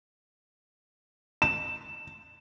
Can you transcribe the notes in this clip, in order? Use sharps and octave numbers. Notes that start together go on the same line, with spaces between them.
E7